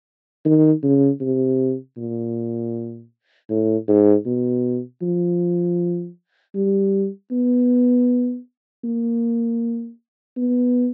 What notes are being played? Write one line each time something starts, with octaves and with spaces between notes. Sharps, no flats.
D#3
C#3
C3
A#2
A2
G#2
B2
F3
G3
B3
A#3
B3